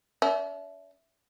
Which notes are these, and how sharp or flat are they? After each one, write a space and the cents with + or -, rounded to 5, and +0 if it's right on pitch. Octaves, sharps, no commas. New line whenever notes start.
D4 -45 E5 +5